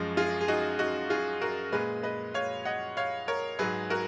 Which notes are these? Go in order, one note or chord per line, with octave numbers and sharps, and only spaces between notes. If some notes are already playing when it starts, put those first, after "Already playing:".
Already playing: F#2 F3 G#3
F4 G#4
G#4
D#4 F#4
D#4 F#4
F4 G#4
F#4 A#4
A#2 G#3 G#4 B4
B4 D#5
C#5 F5
D#5 F#5
C#5 F5
A#4 C#5
G#2 F#3 G#4 B4
F#4 A#4